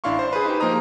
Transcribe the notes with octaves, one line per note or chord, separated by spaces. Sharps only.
A1 D4 E4 F5 C6 C#6
C5
G#4 B4
D#4 G4
F3 A#3 A#4 C5 A#5 D#6